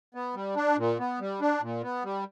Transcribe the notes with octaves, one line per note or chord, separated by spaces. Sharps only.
B3
G3
D4
A#2
B3
G3
D4
A#2
B3
G3